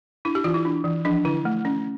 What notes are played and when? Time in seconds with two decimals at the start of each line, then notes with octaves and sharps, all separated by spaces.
0.25 D4 E4
0.35 G4
0.44 E3 F4
0.54 E4
0.65 D4
0.84 E3
1.05 F3 D4
1.25 D3 E4
1.45 A3
1.65 C#4